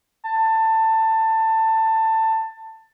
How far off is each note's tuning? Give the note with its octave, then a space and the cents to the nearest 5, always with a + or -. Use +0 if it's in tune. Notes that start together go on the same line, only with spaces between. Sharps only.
A5 +20